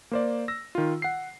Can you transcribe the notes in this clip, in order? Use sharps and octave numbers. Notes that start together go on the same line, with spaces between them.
A#3 C5 D5
E6 A#6
D#3 F4
F#5 C7